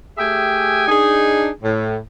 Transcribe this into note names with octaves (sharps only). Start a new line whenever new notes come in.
A3 G4 G#4 E5 G5 G#5
D4 D#4 G#4
A2